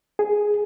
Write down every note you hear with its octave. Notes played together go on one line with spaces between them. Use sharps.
G#4